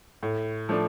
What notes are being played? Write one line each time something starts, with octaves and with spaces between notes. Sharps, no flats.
A2
F3 A3 D4